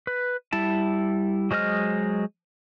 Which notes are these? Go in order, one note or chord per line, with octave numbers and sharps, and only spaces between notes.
B4
G3 E4 A5
F#3 G#3 C5 D#5 F6